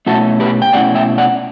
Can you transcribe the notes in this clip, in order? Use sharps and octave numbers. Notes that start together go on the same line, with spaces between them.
B2 A3 C#4 E4 F#4 A4
G4 B4
G5
B2 A3 C#4 E4 D5 F#5
E5 G5
D5 F#5